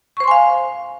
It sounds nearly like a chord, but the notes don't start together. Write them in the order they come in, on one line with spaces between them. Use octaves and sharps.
C#6 C5 C6 G#5 F5